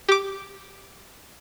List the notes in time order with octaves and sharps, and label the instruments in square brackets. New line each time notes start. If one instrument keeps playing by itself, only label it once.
[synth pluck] G4 D6